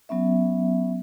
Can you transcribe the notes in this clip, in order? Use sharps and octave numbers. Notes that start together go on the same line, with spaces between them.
F#3 B3 C#4 E5